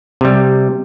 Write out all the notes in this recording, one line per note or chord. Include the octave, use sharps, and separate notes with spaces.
C3 G3